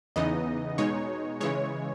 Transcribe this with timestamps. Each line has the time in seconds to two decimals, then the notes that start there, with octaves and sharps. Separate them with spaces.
0.16 E2 C#3 E3 B3 D#4 D#5
0.78 B2 G#3 D#4 C#5
1.40 C#3 E3 G#3 C#5